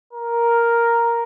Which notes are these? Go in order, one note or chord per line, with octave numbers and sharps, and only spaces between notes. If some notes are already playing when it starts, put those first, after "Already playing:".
A#4